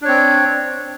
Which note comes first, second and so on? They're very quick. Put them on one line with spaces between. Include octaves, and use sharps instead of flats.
D4 C#5 C4